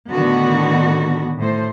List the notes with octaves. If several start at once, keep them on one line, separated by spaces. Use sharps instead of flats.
A2 D3 D#3 B3 F#4
A2 A3 C5